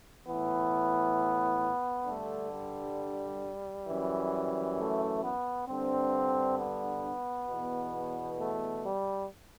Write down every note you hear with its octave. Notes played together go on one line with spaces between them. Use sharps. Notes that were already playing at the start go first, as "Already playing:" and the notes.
A2 E3 B3
G2 D3 A3
G3
F#2 E3
A3
B3
G2 D3 C4
B3
E2 B2
A3
G3